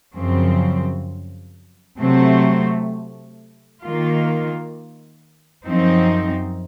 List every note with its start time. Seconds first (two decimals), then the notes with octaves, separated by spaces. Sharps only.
0.16 F#2 C#3 F3 C4
1.99 C3 F#3 A3 C4
3.83 D#3 A#3 F4
5.66 F#2 F3 C4 D#4